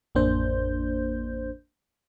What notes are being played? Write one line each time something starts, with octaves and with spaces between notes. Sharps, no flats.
A1 F2 A#3 D4 C5 G6